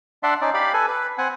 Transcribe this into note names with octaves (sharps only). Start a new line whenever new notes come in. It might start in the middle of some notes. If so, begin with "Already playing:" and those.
D4 D5 E5 F#5 C6
C#4 D#4 D5
G4 D5 F5 B5
A4 B4 G#5
B4
C4 F#5 G#5